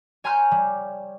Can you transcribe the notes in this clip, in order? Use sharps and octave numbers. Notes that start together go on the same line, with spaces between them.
C#5 G#5 A#5 C6 F6 G6
G3